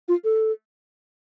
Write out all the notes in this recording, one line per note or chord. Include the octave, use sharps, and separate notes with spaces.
F4
A4